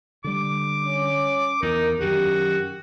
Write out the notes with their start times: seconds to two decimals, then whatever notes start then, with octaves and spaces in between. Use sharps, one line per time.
0.24 D3 G3 D6
0.85 C#4
1.62 E2 D#4 A#4
2.01 F#2 D#3 F#4 G4